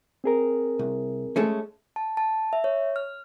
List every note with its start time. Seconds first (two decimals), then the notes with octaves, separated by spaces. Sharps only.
0.24 C4 G#4 A#4
0.79 C2
1.36 G#3 A3 C#4
1.96 A5
2.17 A5
2.53 E5
2.64 C#5
2.96 F6